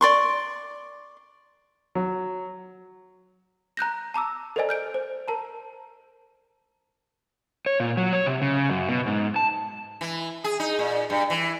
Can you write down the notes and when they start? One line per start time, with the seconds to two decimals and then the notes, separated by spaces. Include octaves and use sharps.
0.01 D5 C6 C#6
1.95 F#3
3.77 A#5 F#6 G6 A#6
4.14 A5 A#5 D6 E6
4.56 A4 A#4 C5 D5 D#5 G#5
4.69 F6 G6 D7
4.94 C5
5.28 A#4 A5 A#5
7.66 C#5
7.80 A#2
7.97 F#3
8.13 C#5
8.26 C3
8.42 C#3
8.69 F#2
8.89 B2
9.06 G#2
9.36 A5
10.01 E3
10.44 G#4
10.60 D#4
10.79 A#2
11.10 G2
11.30 E3